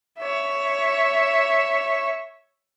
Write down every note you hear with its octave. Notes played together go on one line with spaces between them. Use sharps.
C#5 E5